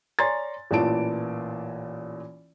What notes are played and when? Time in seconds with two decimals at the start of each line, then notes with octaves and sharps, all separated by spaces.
0.19 C#5 D5 G#5 A#5 C6 A6
0.71 A1 A#2 E3 F4 A5 D7